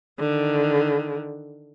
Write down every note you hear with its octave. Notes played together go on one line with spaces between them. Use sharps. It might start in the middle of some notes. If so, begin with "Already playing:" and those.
D3 D#3